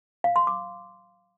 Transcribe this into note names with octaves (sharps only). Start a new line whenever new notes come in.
F5
C6
D6